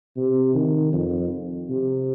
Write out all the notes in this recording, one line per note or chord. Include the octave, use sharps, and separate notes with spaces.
C3
D#3
F2
C3